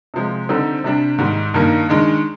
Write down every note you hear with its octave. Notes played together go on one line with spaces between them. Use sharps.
C3 F3 G#3
D3 G3 C4 D#4
C3 G3 D4
G#2 D#3 G3
G2 D#3 G3 A#3 D#4
D#3 G#3 D4